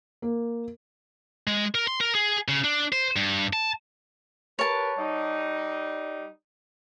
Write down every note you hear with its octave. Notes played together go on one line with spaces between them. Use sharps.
A#3
G#3
A#4
C6
A#4
G#4
C#3
D4
C5
G2
A5
G4 A#4 B4 C#5 A5
G3 D#4